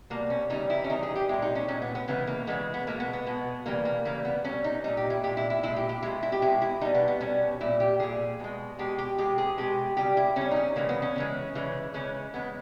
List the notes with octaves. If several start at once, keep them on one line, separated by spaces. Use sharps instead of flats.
B2 G3 A#3
C#4
C#3 E3 G3 D#4
E4
C#4
C#3 E3 G3 D#4
G#4
G4
A#2 G#3 E4
D#4
C#4
A#2 G#3 C#4
B3
B3
C#3 E3 G#3 B3
A#3
C#3 E3 G#3 B3
B3
B2 G#3 A#3
B3
B3
B2 G#3
C#3 E3 G3 A#3
A#3
C#3 E3 G3 A#3
B3
A#2 G3 C#4
D#4
A#2 G3 D#4
G4
E4
A#2 G#3 G4
E4
E4
A#2 G#3 E4
G4
G4
B2 G#3 E4
E4
G4
B2 G#3 E4
E4
B2 G3 D#4
B3
B3
B2 G3 C#4
A#2 G3 E4
G4
A#2 G3 G#4
B2 G#3
B2 G#3 G4
G4
B2 G#3 G4
G#4
B2 G#3 G4
C#3 G3 G4
E4
C#3 G3 C#4
D#4
C#4
C#3 E3 G#3 A#3
B3
C#4
C#3 E3 G#3
C#3 E3 G#3
C#3 E3 G#3 C#4
C#3 G#3 B3